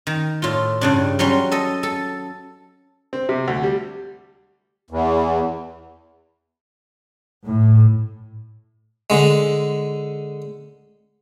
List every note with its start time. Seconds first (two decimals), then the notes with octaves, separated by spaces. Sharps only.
0.07 D#3
0.42 A2 F4
0.81 G2 C#3 D4
1.19 F#3 G3 C#4 C6
1.52 A4 D#5
1.83 A4
3.13 C4
3.29 C3
3.48 D2
3.63 G3
4.91 E2
7.45 A2
9.10 D3 G#3